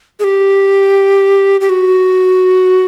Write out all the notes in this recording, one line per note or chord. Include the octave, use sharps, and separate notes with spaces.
G#4
G4
G4
F#4